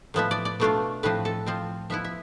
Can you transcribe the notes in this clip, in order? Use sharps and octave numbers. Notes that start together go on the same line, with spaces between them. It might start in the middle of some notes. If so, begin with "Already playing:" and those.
A2 F3 B3 E5
D5
D5
B2 A3 D4 F4
A2 F3 C4 B4
A4
F3 C4 F4
F3 B3 E4 E5
E5